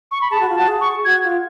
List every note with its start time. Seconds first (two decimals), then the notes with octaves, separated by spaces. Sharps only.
0.11 C#6
0.21 B5
0.31 G#4 A5
0.40 F#4
0.49 F4
0.56 F#4 A5
0.68 G#4
0.81 C#6
1.05 F#4 G#6
1.24 F4